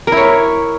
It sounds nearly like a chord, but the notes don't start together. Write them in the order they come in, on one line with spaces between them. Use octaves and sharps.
A#4 E4 C#5